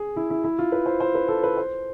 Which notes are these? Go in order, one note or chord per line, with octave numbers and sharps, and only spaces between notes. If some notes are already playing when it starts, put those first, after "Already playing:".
Already playing: G#4
E4
E4
E4
F4
B4
C5
C5
B4
A4
B4
C5